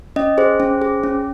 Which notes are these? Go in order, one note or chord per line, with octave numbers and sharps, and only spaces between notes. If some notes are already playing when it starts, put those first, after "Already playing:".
C#4 D#5
G#4 C5
C#4
G#4
C#4